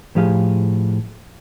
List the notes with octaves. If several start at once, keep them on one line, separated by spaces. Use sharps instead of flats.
A2 F3 G4 G#4 F5